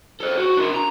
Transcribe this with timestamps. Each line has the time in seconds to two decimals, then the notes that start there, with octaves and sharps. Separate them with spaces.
0.21 A4 C5
0.38 F#4
0.57 D4 A#4
0.75 A#5